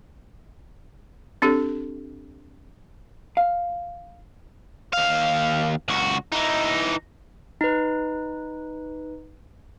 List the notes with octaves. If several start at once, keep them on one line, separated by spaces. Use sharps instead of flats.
C4 D4 G4 A4
F5
D#2 F5
C#2 F#4
E3 D#4
D#4 B4